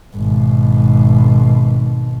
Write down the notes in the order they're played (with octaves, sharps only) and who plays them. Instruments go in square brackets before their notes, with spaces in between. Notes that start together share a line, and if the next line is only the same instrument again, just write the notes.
[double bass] G#1 B2